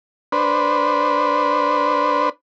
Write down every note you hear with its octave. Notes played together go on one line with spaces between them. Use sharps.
D4 B4 C5